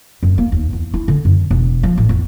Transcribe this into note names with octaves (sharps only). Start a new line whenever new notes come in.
F#2
A#3
D#2
E2
E4
D3
F#2
E1
F3
A1
E2